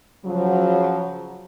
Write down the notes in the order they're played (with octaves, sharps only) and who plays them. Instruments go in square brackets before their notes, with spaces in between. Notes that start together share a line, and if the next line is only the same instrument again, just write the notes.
[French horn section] C#3 F3 F#3